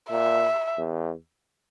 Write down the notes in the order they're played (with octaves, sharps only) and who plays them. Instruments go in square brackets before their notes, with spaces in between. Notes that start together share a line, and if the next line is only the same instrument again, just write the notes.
[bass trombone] A#2 [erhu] E5
[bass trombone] E2